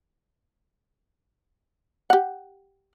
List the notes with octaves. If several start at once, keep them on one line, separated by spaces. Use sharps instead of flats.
G4 F#5